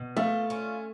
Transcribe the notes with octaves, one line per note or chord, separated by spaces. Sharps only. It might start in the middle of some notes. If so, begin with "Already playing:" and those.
Already playing: B2
A3 F4
C#4